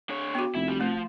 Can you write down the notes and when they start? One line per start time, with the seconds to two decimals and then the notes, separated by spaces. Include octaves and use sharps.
0.09 D3 C#5
0.35 B3 F#4
0.55 F1 E4
0.68 G3
0.81 F3 A3